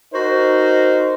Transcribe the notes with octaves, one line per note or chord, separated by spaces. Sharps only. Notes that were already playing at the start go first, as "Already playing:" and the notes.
D#4 F#4 A#4 C5